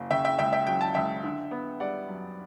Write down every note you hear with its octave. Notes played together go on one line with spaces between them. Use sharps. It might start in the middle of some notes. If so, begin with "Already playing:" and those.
Already playing: F#1
C#3 E5 G5
E5 G5
C#2 E5 G5
E5 G5
F#3 G5
A5
C#2 E5 G5
D3
B3
G3 D5 F#5
F#2